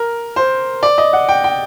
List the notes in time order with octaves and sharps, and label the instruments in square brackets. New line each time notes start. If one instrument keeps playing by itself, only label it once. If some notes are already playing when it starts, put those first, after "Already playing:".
Already playing: [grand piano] A#4
C5
D5
D#5
F#5
G5
G5